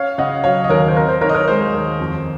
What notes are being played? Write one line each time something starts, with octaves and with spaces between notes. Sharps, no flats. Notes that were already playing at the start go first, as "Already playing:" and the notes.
Already playing: C#4 C#5 F5
C#3 D#5 F#5
F#3 C#5 F5
D#5
D#2 A#4 C#5
C5
C4 A#4
C5
D#3 A#4 C#5
D#5
A#4 C#5
G#3 C5
D#2
F2